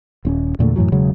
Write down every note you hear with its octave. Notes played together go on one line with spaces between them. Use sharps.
D#1 C4 C#4
E2 A#2 D3 A3
F#2 A2 E3 F#3
E1 C#3 F#3 G#3